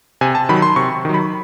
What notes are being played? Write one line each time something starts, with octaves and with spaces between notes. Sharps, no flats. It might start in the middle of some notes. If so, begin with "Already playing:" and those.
C3 G#5
A5
D#3 F#3 B5
C6
C3 C#6
D#3 F#3
B5